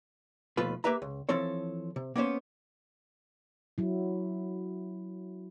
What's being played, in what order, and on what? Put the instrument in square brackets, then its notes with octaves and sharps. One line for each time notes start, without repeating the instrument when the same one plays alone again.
[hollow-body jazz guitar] D#2 B2 F3 A3 F4 B4
A#3 G4 B4 E5 A#5
C#2
E3 F3 C4 A4 C#5
C3
A#3 B3 C#4 C5
[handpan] F#3 E4